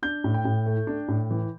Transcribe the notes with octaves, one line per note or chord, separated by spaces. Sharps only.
D4 G6
A2
G5
A2
A3
D4
A2
E3